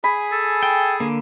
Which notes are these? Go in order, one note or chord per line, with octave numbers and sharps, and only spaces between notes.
G#4 G#5 B5
A4
G5
D3 A#3